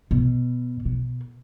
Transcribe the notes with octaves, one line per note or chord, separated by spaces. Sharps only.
B2
B2